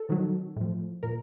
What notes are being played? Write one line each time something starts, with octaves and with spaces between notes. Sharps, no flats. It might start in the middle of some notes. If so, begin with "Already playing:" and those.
Already playing: A4
C3 D#3 F#3
A2 F3
A#2 A#4